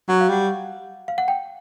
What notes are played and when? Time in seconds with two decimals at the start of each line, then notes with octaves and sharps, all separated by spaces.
0.08 F#3 F#5
0.21 F5
0.29 G3 F#5
1.08 F5
1.18 F#5
1.28 G5